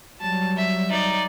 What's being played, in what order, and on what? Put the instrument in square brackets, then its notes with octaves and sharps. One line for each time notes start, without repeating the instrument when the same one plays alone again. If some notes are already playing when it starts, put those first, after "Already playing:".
[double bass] F#3 G3 [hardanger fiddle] A5
[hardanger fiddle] E5
D#4 D5